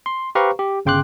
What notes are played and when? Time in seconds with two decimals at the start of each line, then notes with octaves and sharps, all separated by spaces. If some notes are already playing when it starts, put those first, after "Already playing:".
0.06 C6
0.35 G4 B4 C5 F5 A#5 C#6
0.59 G4
0.85 G1 C#3 G5 C6 D6 F#6